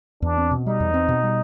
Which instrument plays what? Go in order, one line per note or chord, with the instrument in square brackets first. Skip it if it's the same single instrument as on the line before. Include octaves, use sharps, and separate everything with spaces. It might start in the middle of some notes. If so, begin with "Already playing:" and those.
[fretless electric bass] E2 [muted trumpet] D4
[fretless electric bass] C4
B2
[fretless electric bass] G3 [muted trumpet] D#4
[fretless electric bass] E2
C4
B2
G3